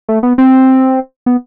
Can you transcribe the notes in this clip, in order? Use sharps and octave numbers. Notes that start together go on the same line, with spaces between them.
A3
B3
C4
B3